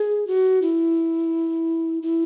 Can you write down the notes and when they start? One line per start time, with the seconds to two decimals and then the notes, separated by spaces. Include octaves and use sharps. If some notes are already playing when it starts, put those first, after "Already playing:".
Already playing: G#4
0.27 F#4
0.62 E4
2.03 E4